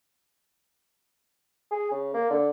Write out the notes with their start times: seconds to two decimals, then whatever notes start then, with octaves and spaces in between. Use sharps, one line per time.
1.71 G#4
1.91 C#3
2.14 A#3
2.30 D3